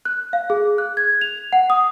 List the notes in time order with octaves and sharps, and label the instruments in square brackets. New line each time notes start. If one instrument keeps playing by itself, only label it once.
[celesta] F#6
F5
G#4
F#6
G#6
F7
F#5
D#6